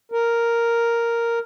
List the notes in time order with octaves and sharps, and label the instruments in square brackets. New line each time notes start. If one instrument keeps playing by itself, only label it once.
[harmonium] A#4